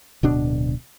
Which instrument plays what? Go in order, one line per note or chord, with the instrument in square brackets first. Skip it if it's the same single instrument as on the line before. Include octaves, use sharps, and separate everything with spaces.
[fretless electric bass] D1 B2 D4